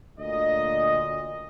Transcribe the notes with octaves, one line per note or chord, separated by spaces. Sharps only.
D2 A#2 D4 D#5